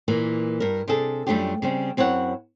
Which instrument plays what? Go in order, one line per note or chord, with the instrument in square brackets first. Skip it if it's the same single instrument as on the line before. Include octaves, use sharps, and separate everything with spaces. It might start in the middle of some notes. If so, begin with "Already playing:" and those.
[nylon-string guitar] A#2 E3 A#3
G2 A#4
C3 D4 G#4 A4
F#2 G3 A3 D4 F4 G4
C#3 G3 C4
F#2 C4 E4 C#5 F#5